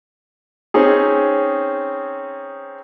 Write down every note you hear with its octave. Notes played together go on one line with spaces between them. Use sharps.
C4 C#4 D#4 G#4